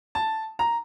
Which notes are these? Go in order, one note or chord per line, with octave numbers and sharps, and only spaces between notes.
A5
A#5